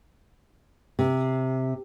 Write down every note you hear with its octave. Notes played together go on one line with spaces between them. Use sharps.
C3